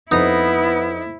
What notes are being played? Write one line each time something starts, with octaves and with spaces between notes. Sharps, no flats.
F2 B3 D#4 E4 A#5